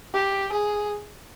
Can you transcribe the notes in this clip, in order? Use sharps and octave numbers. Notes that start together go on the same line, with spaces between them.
G4
G#4